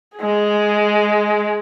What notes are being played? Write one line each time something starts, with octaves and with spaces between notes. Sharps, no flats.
G#3 G#4